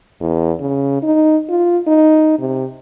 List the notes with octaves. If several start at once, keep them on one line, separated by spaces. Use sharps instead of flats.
E2
C#3
D#4
F4
D#4
C3